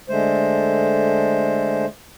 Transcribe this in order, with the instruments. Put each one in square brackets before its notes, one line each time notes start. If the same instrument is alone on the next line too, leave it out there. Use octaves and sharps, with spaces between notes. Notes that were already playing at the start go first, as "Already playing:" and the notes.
[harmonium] D3 G#3 A3 C5